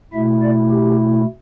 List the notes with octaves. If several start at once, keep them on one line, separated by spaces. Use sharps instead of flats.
B2 A3 E4 E5
D5
G4